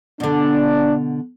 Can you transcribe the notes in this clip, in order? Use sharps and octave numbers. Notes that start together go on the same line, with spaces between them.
B2 D3 D4